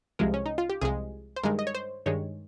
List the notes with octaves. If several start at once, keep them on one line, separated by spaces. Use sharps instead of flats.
C2 C3 F3 G#3 A#4
C#4
D#4
F4
G4
C2 C3 F3 G#3 G#4
C5
G2 D#3 G#3 A#4
D#5
C#5
C5
G2 D#3 G#3 C#5